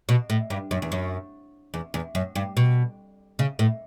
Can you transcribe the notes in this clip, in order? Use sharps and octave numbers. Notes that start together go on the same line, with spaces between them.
B2
A2
G2
F#2
E2
F#2
E2
E2
F#2
G2
B2
C#3
A2